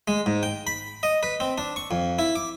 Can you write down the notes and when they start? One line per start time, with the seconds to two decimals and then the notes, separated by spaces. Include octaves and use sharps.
0.08 G#3
0.26 G#2
0.43 G5
0.67 B5
1.03 D#5
1.23 B4
1.40 C4
1.58 D4
1.76 C#6
1.91 F2
2.19 E4
2.36 D6